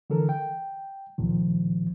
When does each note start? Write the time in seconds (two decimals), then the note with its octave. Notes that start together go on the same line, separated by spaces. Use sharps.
0.10 D3 E3 A4 A#4
0.29 G5
1.18 C#2 A#2 D#3 F3